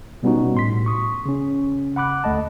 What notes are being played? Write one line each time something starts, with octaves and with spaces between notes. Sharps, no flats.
B2 G3 B3 C#4 D#4 F#4
A2 C6 B6
C#6 D#6
C#3 C#4
F#5 B5 D6 F#6
D2 A3 D#5 A5